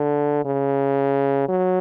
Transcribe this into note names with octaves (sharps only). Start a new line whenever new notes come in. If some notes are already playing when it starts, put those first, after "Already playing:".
Already playing: D3
C#3
F#3